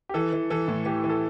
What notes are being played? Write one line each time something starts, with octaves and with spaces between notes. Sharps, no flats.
G4
E3 A4
E3
E3 A4
A2
E3 G4
E3
A4